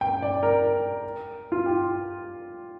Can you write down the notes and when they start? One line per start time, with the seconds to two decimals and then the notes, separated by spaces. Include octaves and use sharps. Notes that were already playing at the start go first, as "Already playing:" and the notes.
0.01 G5
0.22 D5
0.43 A#4
1.52 F4
1.66 G4